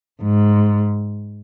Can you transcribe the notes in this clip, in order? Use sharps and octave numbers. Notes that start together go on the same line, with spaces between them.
G#2